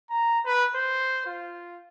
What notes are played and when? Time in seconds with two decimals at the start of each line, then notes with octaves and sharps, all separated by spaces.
0.10 A#5
0.45 B4
0.75 C5
1.26 F4